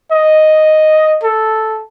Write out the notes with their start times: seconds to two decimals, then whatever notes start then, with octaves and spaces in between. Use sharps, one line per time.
0.11 D#5
1.23 A4